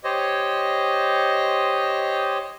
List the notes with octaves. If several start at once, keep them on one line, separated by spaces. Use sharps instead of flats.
G4 C5 C#5 D#5